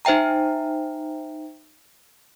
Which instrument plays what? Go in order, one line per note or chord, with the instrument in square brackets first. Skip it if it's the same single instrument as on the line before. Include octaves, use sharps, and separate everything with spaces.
[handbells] D#4 C5 E5 G5 A#5